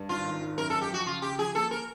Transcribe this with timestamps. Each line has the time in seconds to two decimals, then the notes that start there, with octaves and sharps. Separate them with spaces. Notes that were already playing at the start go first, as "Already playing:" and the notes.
Already playing: G2
0.09 G#1 F4
0.25 D#3
0.41 G#1
0.58 F#2 A#4
0.70 F#2 A4
0.81 G4
0.90 F3 F#4
1.06 C#3 F4
1.22 C#3 G4
1.38 F3 G#4
1.55 A#3 A4
1.71 A#4